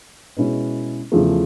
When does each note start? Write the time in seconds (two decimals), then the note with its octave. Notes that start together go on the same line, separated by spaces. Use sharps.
0.37 B2 G#3 C#4 E4
1.12 E2 C#3 F3 A3